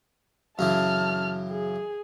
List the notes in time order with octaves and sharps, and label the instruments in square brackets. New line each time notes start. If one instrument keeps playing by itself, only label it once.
[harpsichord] F#2 C#3 E3 [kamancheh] A5 F6
[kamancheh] G#4